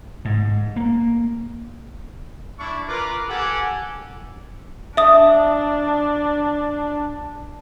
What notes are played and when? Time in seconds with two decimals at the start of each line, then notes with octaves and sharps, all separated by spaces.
0.25 G#2
0.76 A#3
2.59 D4 E4 C#6
2.88 F4 A#4 B4 D6
3.28 G4 A4 F#5 G#5
4.97 D4 E5 D#6